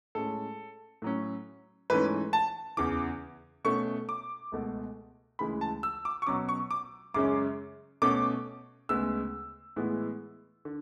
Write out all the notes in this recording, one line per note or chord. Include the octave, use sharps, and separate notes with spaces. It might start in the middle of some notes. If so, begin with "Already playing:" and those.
A2 G#3 C#4 A4
A2 F#3 C#4
G#2 E3 A3 C#4 B4
A5
E2 C#3 E3 D6
B2 A3 C#4 C#6
D6
C#2 B2 A3
D2 C#3 E3 G#3 B5
A5
E6
D6
C#6
B2 F#3 C#4 D6
C#6
D6
F#2 C#3 G#3 C#4 D6
B2 A3 C#4 D6
D2 C#3 G#3 B3 E6
A2 E3 G#3 B3
D3